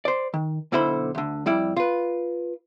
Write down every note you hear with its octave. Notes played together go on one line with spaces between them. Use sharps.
C5 D5
D#3
B1 B2 D3 E4 C5 B5
D2 D3
F2 G3 E4 D5
F4 B4